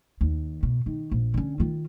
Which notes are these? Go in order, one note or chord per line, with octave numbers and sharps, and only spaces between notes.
D#2
B2
D#3
A#1
D3 C#4
D#3 F4